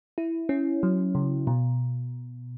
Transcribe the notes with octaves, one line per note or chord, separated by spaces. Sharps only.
E4
C#4
F#3
C#3
B2